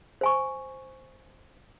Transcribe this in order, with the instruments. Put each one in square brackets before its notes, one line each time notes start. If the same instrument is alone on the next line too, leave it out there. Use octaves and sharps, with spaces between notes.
[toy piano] C5 G#5 C#6